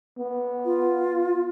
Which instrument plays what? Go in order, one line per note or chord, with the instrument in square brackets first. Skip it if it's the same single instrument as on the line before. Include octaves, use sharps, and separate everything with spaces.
[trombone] B3
[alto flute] F4